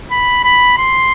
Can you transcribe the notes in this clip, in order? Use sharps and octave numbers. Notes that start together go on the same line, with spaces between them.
B5
B5
C6